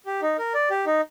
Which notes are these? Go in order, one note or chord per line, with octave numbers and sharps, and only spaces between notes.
G4
D#4
A#4
D5
G4
D#4